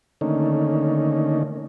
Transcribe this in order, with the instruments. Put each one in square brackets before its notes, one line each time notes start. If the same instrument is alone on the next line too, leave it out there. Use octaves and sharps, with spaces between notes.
[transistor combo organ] D3 D#3 A3 A#3 C#4 D#4